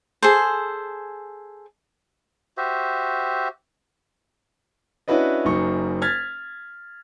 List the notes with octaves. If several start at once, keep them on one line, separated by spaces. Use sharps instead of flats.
G#4 A4 C5
F#4 G4 C5 E5
C#4 D4 E4 F#4 B4 D#5
F#1 F#2 D#4 C#6
F6 G#6 A6 B6